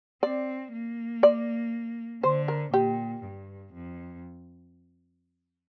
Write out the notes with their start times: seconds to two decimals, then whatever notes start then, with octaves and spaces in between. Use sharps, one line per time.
0.23 C4 D5
0.73 A#3
1.23 D5
2.23 D3 C5
2.48 A#4
2.73 A#2 G4
3.23 G2
3.73 F2